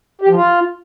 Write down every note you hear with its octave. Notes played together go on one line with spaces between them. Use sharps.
G4
F3
F4